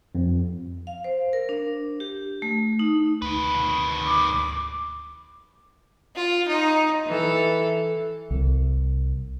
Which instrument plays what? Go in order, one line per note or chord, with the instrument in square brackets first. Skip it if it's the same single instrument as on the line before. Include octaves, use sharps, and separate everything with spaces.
[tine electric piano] F2
[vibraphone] F5
C5
A#4
D4
G4
A3
D#4
[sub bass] D2 [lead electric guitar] D#3 B4
[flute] D6
[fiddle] F4
D#4
[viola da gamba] E3 A4
[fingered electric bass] C2